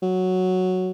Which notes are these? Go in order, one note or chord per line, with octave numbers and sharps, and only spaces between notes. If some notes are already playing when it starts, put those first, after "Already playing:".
F#3